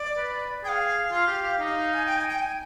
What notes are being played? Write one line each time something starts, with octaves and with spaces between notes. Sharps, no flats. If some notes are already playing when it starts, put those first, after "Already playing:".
Already playing: D5
B4
G#4 F5 G5
F4
G4
G4
D#4
G#5
G5
G#5
G5
G#5